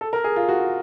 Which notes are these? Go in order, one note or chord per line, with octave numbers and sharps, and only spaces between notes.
A4
A#4
G#4
F4
F#4